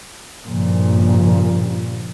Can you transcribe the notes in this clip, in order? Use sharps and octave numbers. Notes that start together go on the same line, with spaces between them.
G2 A#2 C#3 F3